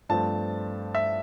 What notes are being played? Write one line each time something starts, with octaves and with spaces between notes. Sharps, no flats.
G2 F3 A3 C4 A5
E5